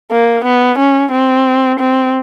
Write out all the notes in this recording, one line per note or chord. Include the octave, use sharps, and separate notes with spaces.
A#3
B3
C#4
C4
C4